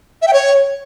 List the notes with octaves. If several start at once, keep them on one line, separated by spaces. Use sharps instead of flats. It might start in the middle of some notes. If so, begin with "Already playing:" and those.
E5
G5
C#5